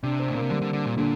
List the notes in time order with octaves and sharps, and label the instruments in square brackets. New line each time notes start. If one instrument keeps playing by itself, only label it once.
[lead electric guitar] C3 [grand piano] D4
[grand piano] C4
[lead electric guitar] A2
[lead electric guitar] A#2 [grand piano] A#3
[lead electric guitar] C3
[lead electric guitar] D3 [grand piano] G3
[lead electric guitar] D3
D3
A#2
[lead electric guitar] A#2 [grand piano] D3